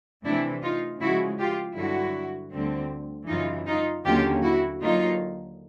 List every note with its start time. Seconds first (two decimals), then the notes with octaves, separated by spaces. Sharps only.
0.25 C3 E3 A3 D4 E4
0.63 D#4 F4
1.01 C#3 F3 G#3 E4 F#4
1.39 F4 G4
1.77 G2 D3 F#3 E4 F#4
2.53 D2 D3 G3 C4
3.28 F#2 C#3 E3 D#4 F4
3.67 D#4 F4
4.04 D#2 D3 F#3 A#3 C#4 F4 G4
4.43 E4 F#4
4.80 D#2 D3 F#3 A#3 D#4 F4